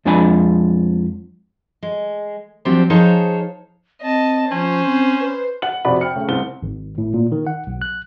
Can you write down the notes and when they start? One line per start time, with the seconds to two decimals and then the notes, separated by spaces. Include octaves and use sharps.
0.05 F2 F3 G#3 D4 G#5 B5
1.83 G#3
2.65 F3 F#3 C4 D4 G4 C5
2.90 F3 D#4 G#4 C5 C#5 A5
4.02 C4 D#5 A5
4.51 F3 C#4 C5
4.86 C4
5.20 B4
5.62 F#5 F#7
5.85 F2 C3 F#4 D5 F#5 B5
6.01 G5 F6 C#7
6.16 C#3 A3
6.28 C2 C4 G7
6.63 G#1
6.98 A2
7.14 A#2
7.32 D#3
7.47 F#5
7.67 B1
7.82 F#6